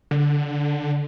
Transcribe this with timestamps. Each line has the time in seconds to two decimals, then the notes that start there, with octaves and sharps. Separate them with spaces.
0.11 D3